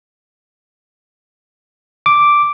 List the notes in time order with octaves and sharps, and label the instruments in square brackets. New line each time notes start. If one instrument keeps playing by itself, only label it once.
[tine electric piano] D6